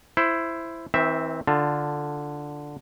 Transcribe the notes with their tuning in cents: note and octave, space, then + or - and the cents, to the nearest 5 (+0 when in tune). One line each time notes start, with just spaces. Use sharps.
E4 +10 C5 +0
E3 -40 C4 +0 E5 -5
D3 +0 F4 +0 A5 +15